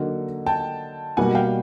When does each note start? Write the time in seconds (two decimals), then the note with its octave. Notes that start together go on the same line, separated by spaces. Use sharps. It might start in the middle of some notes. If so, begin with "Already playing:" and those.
Already playing: D3 F#3 A#3 D#4 F#4
0.46 G5 A5
1.17 B2 G3 A#3 D#4 F#4 F#5 G#5
1.35 F5 G5